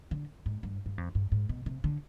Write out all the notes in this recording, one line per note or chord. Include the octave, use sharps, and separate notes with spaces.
D3
G#2
G2
G2
F2
G2
G#2
B2
C3
D3